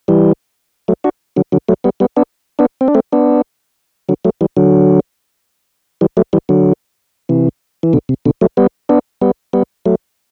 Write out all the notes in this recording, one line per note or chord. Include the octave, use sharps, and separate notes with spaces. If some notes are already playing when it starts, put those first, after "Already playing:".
E3 G3
F#3 A3
D4 F#4
D3 F#3
D3 F#3
F#3 A3
G3 B3
G3 B3
B3 D4
B3 D4
C4
D4
A3 C4
B3 D4
D3 F#3
F#3 A3
E3 G3
D3 F#3
E3 G3
F#3 A3
E3 G3
D3 F#3
C3 E3
E3
B2 D3
C3
B2 D3
F#3 A3
G3 B3
B3 D4
G3 B3
G3 B3
F#3 A3